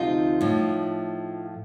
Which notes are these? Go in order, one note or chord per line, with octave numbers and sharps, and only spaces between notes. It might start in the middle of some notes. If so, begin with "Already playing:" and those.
Already playing: D2 C3 F3 D#4 F4
A2 F3